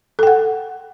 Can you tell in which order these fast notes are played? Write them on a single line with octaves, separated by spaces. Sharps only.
A4 G5 F#5